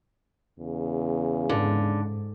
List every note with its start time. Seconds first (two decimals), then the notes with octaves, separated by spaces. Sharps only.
0.59 E2 C#3
1.49 G#2 D3